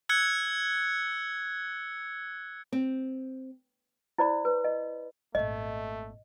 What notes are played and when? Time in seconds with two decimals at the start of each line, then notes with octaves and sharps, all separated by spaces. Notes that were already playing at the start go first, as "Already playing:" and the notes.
0.09 E6 F#6 G#6 C#7
2.72 C4
4.18 E4 C5 D5 B5
4.45 B4
4.64 D#5
5.35 G#1 A#2 A3 D#5